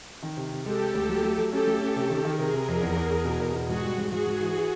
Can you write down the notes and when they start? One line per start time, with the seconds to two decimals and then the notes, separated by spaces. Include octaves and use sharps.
0.22 D#3
0.37 C3
0.51 C3
0.65 G#3 G4 A4
0.80 G#3
0.94 D2
1.08 F#3
1.23 A3
1.38 F#3
1.52 C#4 G4 A4
1.67 A3
1.81 C#4
1.96 C3
2.10 D#3
2.25 D#3
2.38 C3 G#4 A#4
2.53 C3
2.68 F2
2.81 E2
2.96 E2
3.10 E2
3.25 B2
3.40 E2
3.54 B2
3.69 G#2 F#4 G#4
3.83 G3
3.98 G#2
4.12 G#2 F#4 G#4
4.27 G#2
4.40 E3
4.56 E3